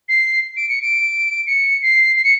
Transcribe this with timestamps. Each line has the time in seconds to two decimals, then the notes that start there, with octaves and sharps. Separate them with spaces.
0.09 C7
0.57 D7
0.69 C#7
0.82 D7
1.47 C#7
1.82 C7
2.16 C7
2.24 C#7